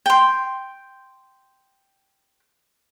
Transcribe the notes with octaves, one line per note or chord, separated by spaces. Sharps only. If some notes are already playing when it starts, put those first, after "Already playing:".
G5 C6